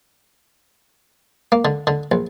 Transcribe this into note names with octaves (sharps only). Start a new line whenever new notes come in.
A#3
D3
D3
A#1